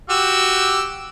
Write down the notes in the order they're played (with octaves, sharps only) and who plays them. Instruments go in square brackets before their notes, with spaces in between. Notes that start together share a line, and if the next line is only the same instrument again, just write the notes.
[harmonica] F#4 G4 E6